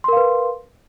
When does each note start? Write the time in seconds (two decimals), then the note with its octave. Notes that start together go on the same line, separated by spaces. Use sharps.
0.04 C6
0.08 A#4
0.13 F5
0.17 B4